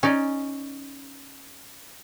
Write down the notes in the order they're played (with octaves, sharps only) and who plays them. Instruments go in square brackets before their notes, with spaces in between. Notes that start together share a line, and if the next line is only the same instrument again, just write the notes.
[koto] C#4 D#4 D5